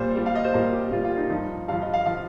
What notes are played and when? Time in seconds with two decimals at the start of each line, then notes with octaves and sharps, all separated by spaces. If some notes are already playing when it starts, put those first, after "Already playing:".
Already playing: A#2 G3 C5
0.16 A#2 G3
0.26 F5
0.35 D#5
0.44 C5
0.54 A#2 G3 A#4
0.73 G4
0.91 A#2 G3 F4
1.04 F4
1.18 D#4
1.30 G2 F3 D#4
1.68 G2 F3 F5
1.82 D#5
1.93 F5
2.06 F3 F5